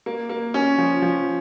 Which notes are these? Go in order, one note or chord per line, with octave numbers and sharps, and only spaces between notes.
A#3
A#3
C#4
F3
F3